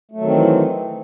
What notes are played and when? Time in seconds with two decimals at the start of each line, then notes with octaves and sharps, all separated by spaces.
0.12 A3
0.16 F#3
0.21 D#3
0.26 C4
0.31 E3